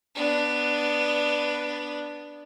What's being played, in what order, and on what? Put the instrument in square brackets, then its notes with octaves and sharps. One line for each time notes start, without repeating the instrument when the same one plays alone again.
[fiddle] B3 D4